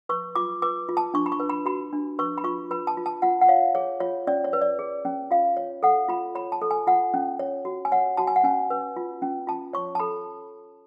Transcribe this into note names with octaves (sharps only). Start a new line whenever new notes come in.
B4 C#6
F4 D6
B4 D6
F4
A5
D4 C#6
B5
C#6
B4
B5
F#4 B5
D4
B4 C#6
B5
F4 C#6
B4 B5
A5
F4
A5
F4 F#5
F#5
C#5 F5
G#4 C#5
F4 C#5
C#4 D5
C#5
B4
D5
G#4
C#4
F4 F5
C#5
A4 F#5
F4 B5
C#5 B5
A5
A4
G#5
F4 F#5
C#4
C#5
F#4
G#5
C#5 F#5
F#4 A5
G#5
F#5
C#4 G#5
B4
F4
C#4
F4 A5
C#5 C#6
A5
A4 B5